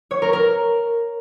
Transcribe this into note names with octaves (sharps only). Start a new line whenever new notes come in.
C#5
A#4
A#4